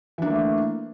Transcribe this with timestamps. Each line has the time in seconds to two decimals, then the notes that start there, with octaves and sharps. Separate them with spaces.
0.18 E3
0.22 D4
0.26 A#3
0.30 A3